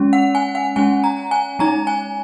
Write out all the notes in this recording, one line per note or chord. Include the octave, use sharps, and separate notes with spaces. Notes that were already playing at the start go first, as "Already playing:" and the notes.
Already playing: G#3 C#4
F#5
G#5
F#5
G#3 C#4 G#5
A#5
G#5
G#3 D#4 A#5
G#5